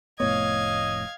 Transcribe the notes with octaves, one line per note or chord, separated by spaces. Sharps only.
F1 A2 B3 C#5 D#5 F5 G#6